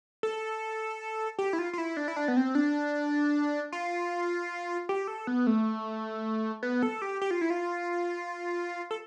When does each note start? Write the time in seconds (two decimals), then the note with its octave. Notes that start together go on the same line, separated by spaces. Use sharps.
0.23 A4
1.38 G4
1.53 E4
1.59 F4
1.73 F4
1.78 E4
1.97 D4
2.08 E4
2.16 D4
2.28 B3
2.37 C4
2.55 D4
3.72 F4
4.89 G4
5.08 A4
5.27 B3
5.47 A3
6.63 B3
6.83 A4
7.02 G4
7.21 G4
7.31 F4
7.41 E4
7.50 F4
8.91 A4